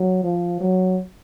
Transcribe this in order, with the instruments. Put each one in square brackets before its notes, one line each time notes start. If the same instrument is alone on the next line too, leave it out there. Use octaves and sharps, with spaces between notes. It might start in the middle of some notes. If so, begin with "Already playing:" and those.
Already playing: [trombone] F#3
F3
F#3